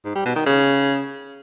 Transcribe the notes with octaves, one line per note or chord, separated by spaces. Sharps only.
G#2
G3
B2
D#3
C#3